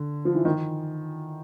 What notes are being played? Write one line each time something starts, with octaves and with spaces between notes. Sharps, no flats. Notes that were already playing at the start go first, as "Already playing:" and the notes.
Already playing: D3
F3
E3
D#3